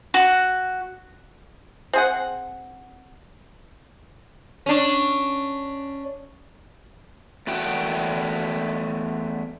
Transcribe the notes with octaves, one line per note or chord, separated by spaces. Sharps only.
F#4
C4 G#4 F#5
C#4 D4
E2 A3 F#4 G5